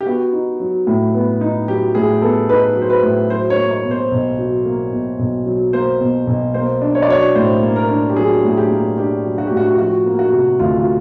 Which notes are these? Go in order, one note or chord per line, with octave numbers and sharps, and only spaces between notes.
G4
B3 F#4
D#4
F#3
A2
B3
D#4
F#3 G4
A2 G#4
B3 A4
D#4 B4
F#3
C5
B4
A2
F#3 C5
C#5
A#3
C#5
B2
C5
B1
F#3
A#3
B2
B1
F#3
A#3 C5
B2
B1
A#3 C5
D4
C#5
D5
F#3 C#5
A2 C5
A#3
A#4
D4
G4
F#3 G#4
A2 G#4
G4
A#3
D4 G4
F#3
F#4
A2 G4
F#4
G4
F3 F#4
A#3
F#4
C3
D2 F4
F#4
F4